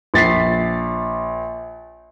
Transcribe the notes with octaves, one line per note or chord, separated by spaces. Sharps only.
A#1 A6 B6 C7